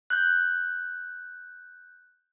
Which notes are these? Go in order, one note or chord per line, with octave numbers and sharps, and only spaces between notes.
F#6 G6